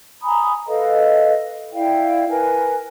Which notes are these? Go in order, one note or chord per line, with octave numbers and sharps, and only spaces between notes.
G#5 A#5 B5 D#6
A4 B4 D#5 F5
E4 D5 F5 G5
A#4 B4 G#5